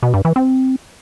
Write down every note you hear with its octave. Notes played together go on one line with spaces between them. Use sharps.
B2
G2
E3
C4